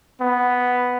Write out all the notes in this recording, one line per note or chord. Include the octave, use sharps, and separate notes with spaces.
B3